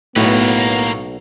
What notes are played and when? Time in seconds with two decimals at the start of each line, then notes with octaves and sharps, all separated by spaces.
0.16 B1 A2 A#3 B3 B4